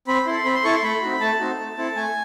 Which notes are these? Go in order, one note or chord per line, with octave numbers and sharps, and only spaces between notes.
C4 B5
E4 A4 C6
C4 B5
C6
E4 A4 C#6
C6
A3 B5
C4 D#4 F#4
A3 A5
C4 D#4 F#4
A3
C4 E4 A4
A3 G#5